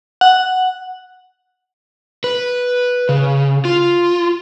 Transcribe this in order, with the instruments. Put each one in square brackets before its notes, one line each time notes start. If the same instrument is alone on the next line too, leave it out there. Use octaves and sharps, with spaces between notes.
[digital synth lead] F#5
[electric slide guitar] B4
C#3
F4